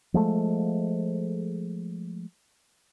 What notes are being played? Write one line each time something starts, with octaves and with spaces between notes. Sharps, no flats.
F3 G#3 A3